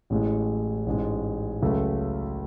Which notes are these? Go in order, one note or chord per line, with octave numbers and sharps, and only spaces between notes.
A1 A2 G#3
A1 G#2 G#3
C#2 C#3 F#3 A3